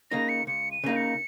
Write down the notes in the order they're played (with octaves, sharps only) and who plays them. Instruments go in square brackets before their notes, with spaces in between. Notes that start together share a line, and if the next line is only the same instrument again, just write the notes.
[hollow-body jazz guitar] C#3 A#3 D#4 [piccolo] A#6
[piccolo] C#7
[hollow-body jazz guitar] C#2 [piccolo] C#7
[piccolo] D#7
[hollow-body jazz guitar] C#3 A#3 D#4
[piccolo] C#7